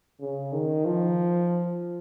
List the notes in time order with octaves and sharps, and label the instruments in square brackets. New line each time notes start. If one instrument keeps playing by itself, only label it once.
[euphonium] C#3
D#3
F3